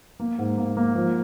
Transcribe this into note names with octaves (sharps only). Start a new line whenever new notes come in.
A#3
G#2
A#3
A#3
F3